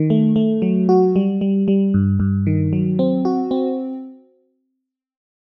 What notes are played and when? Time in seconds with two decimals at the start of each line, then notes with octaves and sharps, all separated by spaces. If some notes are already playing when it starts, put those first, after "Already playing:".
Already playing: D#3
0.10 A3
0.36 A3
0.62 F#3
0.89 F#4
1.16 G3
1.41 G3
1.68 G3
1.94 G2
2.20 G2
2.47 D#3
2.73 F#3
2.99 C4
3.25 F#4
3.51 C4